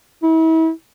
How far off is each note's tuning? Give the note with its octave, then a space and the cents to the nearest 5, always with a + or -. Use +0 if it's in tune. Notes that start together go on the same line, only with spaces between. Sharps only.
E4 -35